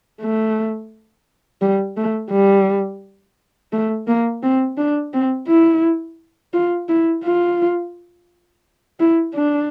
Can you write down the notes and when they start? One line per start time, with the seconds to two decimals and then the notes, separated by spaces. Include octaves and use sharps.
0.21 A3
1.62 G3
1.97 A3
2.32 G3
3.72 A3
4.08 A#3
4.43 C4
4.78 D4
5.14 C4
5.48 E4
6.54 F4
6.89 E4
7.24 F4
9.00 E4
9.35 D4